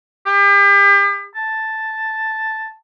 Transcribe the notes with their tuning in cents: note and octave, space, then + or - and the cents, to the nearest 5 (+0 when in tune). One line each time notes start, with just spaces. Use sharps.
G4 +40
A5 +0